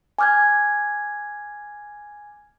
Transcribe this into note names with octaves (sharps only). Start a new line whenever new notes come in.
G#5 D6 F6 G6 G#6